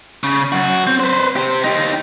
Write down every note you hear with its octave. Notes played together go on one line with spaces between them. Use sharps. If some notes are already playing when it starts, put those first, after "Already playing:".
C#3
F#2 F#4
C4
B4 C5
G4 C5
D#4 G4